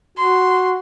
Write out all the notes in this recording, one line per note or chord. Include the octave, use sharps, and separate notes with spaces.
F#4 C6